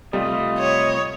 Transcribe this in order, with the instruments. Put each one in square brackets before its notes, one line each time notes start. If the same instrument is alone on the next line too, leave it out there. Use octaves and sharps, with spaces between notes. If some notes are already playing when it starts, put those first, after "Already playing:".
[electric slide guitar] C3 A3 F4 [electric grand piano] G3 [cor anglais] D#5
[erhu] C#5